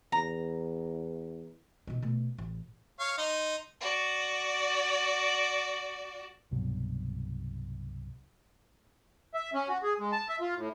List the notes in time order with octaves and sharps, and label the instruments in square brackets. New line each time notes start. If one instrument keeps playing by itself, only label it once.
[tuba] E2 [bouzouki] A#5
[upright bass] B2 D#4
B2 A3
A1
[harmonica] C#5 F5 C#6
D#4 D#5 C6
[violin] F#4 D5
[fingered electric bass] C2 G2 B2 F#3
[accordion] E5
C#4
F#4
G#4
G#3
A5
E5
F4
A2